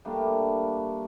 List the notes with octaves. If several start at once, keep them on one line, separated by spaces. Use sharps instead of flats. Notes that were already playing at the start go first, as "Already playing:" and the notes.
G3 A3 A#3 D4